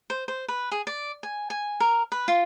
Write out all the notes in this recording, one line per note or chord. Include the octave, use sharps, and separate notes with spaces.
C5
C5
B4
G#4
D5
G#5
G#5
A#4
B4
F4